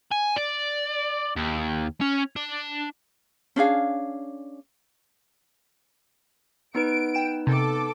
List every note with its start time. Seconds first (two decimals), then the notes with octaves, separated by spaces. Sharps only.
0.12 G#5
0.37 D5
1.36 D#2
2.01 C#4
2.36 D4
3.56 C#4 D4 G#4 F5
6.75 B3 D#4 B4 D7
7.15 G5 E7
7.47 C3 A4 D6